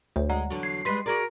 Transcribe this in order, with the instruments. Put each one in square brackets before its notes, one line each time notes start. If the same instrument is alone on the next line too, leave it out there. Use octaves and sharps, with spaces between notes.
[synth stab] D2 [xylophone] C#5
[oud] G#3 [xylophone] D5 F#5 A#5
[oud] E2 D3 F#3
[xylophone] G#6 [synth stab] C7
[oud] G3 G#3 [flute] B4 [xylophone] C6 B6 D#7
[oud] F#4 G#4 D5 [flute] A#4